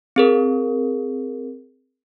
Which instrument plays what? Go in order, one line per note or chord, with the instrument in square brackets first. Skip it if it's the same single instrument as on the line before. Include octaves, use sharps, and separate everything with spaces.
[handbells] C4 G#4 A#4